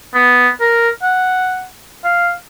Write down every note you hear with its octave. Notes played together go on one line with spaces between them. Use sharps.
B3
A#4
F#5
F5